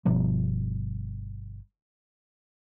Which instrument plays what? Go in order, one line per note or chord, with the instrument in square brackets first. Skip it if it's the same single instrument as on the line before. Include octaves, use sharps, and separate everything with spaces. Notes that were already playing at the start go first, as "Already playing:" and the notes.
[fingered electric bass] G1 B2 F3 G3